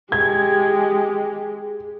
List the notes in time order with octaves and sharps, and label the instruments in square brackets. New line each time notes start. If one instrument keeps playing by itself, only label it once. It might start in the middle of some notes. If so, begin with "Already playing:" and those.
[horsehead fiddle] G#3 G4 [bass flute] G#4 [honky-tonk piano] G#6